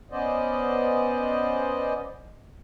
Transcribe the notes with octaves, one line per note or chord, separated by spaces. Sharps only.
B3 C#4 C5 D5 D#5